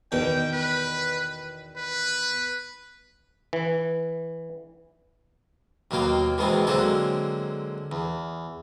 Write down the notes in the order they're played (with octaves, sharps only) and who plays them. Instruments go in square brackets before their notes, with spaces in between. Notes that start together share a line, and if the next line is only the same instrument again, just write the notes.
[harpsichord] E2 B2 D#3 [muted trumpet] G5
[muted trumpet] B4
B4
[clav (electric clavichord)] E3
[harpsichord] D#2 B2 F#3 A#3 F5 G5
E2 B2 D#3 G#3 B3 C4
D3 F#3 G#3 A#3 C4 A4
E2